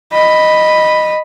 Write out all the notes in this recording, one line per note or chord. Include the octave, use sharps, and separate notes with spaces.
D#5 B5